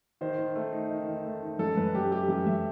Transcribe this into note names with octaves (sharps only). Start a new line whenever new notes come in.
D#3 C5
D#3
A3
D#4
D#3
D#3
A3
D#4
F#2 A4
F#2 B4
F#3 G4
A3 G4
F#2 G4
F#2 E5